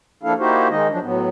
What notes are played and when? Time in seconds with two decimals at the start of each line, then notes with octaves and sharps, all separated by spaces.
0.23 F3 A#3 D4 E4 A4 F5
0.38 A#3 D#4 E4 F#4 G4 C5
0.69 D#3 G#3 D#4 D#5
0.90 F3 F#3 D4
1.02 A2 F#3 B3